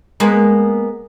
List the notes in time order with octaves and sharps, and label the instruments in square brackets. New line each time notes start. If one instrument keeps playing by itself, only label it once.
[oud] G#3 A#3 B3